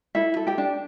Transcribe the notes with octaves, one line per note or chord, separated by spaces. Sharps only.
E4 A4 E5
A4
G4 G5
D4